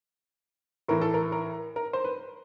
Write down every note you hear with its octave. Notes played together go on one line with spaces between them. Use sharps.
A2 E3 A#4
A4
A#4
A#4
A#4
C5
B4